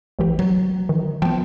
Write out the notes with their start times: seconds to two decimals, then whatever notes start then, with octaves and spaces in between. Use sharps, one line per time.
0.19 A1 E3 G4
0.39 F#3
0.89 D#3
1.22 F3 B3 G5 A5